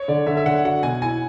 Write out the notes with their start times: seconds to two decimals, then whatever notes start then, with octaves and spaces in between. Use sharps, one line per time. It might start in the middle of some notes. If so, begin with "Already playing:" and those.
Already playing: C#5
0.08 D3 D5
0.26 D3 E5
0.37 E5
0.45 D3 F#5
0.64 F#4 F#5
0.83 B2 G#5
1.02 E4 G#5